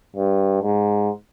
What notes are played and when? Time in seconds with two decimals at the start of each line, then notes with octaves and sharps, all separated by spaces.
0.16 G2
0.62 G#2